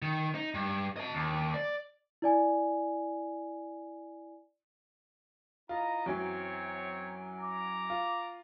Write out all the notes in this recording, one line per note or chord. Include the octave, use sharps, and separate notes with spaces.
D#3
D#4
G2
D#5 A5
D#2
D5
E4 D5 G#5
E4 F4 D#5 A#5
F#2 E3 F#3 C4 C#5
A#5 D6
F4